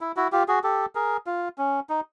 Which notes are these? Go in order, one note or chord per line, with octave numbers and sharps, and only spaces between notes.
E4
E4 F#4
F4 G4
F#4 G#4
G4 A4
G#4 A#4
F4
C#4
D#4